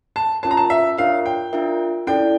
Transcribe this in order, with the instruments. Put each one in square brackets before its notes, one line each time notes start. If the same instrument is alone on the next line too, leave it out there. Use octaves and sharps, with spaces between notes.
[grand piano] A5
[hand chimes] C#4 F4 A#4 C#5 [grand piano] A5
[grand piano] A#5
A5
E5
[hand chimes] D4 F4 A#4 C#5 E5 [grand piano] F5
[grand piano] G5
[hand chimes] D4 F4 A#4 E5
[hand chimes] C#4 E4 A4 D5 [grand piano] G5